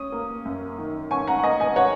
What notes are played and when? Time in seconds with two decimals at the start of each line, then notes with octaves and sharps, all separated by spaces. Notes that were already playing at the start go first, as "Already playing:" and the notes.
Already playing: C#4 D#6
0.12 A#3
0.45 F#2
0.78 D#3
1.11 C#4 G#5 C#6
1.27 F#5 A#5
1.39 F#5
1.43 A#3 D#5 G#5
1.60 D#5 G#5
1.76 C#5 F#5